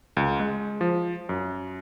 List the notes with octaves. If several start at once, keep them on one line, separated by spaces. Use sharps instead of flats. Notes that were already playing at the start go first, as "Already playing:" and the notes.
C#2
G#3
F3
F#2